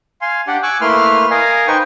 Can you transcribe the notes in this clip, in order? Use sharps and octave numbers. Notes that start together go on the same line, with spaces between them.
F5 G#5 C6
D4 G4 D5 F#5 G5
G#5 C#6 D6 E6 F#6
A3 A#3 E4 B4 C6 F6
A#4 D#5 F5 G#5
D#4 B4 C5 G5 C#6